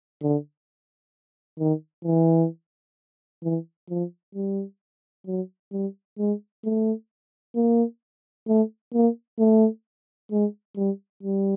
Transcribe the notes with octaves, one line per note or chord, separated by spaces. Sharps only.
D3
D#3
E3
E3
F3
G3
F#3
G3
G#3
A3
A#3
A3
A#3
A3
G#3
G3
G3